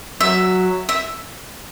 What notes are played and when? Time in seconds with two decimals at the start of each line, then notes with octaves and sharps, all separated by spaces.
0.20 F#3 E5
0.89 E5